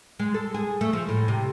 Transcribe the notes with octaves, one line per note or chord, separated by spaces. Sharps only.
G#3
A4
G#4
A3
F3
A2
C3